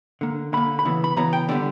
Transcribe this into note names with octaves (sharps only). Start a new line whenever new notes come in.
D3 A#3
D3 A#3 B5
B5
C#3 E3 B3
B5
C#3 E3 B3 A#5
G5
D3 G3 B3 D5